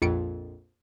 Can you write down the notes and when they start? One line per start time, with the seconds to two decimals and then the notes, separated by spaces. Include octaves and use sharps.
0.02 A#1 F2 C#7 D7